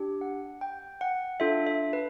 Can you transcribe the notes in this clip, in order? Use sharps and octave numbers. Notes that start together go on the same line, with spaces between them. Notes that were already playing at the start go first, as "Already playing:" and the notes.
Already playing: D4 G4
F#5
G5
F#5
D4 F4 A4 E5
E5
B4